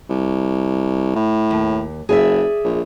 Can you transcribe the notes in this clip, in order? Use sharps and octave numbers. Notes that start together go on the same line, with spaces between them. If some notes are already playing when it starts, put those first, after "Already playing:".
C2
A2
D#2
F#1 G#4 D5 E5
A#1